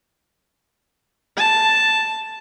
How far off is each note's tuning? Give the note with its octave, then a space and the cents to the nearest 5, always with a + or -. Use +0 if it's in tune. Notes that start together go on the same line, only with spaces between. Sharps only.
A5 +0